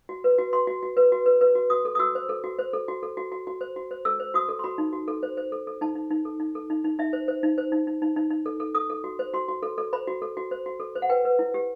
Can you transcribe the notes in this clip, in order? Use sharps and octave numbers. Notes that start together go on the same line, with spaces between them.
F#4
B4
F#4
F#4 C6
F#4
F#4
B4
F#4
B4
B4
F#4
F#4 D#6
A4
D#6
F#4 E6
C5
A4
F#4
C5
A4
F#4
A4
F#4
F#4
F#4
C5
F#4
C5
A4 E6
C5
F#4 D#6
A4
C6
F#4 B5
D#4
F#4
A4
C5
C5
A4
A4
D#4 A5
D#4
D#4
A4
D#4
A4
D#4
D#4
D#4 E5
C5
C5
D#4
C5
D#4
D#4
D#4
D#4
D#4
A4
A4
A4 D#6
A4
F#4
C5
F#4 C6
F#4
A4
A4
C5 B5
F#4
A4
F#4
C5
F#4
A4
C5
F#5
B4 G5
B4
E4
G4